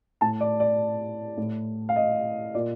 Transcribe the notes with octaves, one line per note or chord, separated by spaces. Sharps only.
A2 A5
D5
D5
A2
F5
D#5
A#2 D5